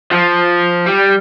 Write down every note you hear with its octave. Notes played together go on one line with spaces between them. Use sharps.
F3
G3